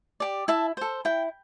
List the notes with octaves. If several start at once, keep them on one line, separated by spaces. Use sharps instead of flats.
G4 D5
E4 E5 A5
A4 C5
E4 G5